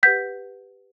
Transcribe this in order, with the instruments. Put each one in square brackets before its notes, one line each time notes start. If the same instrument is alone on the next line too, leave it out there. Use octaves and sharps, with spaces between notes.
[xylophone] G4 B4 F#5 G6 B6